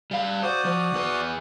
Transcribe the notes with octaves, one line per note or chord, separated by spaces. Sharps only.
G3 F5
F#4 C5 D5 D#6
F3
E2 B4